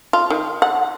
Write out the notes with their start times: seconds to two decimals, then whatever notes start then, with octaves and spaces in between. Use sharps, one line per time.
0.13 F4
0.30 D#3
0.62 F#5